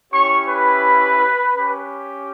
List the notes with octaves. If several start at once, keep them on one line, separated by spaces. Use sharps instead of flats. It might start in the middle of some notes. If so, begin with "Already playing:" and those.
C#4 E4 G4 C#5 C#6
B4 B5
C#4 G4